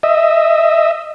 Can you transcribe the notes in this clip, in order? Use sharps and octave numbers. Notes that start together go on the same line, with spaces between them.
D#5 E5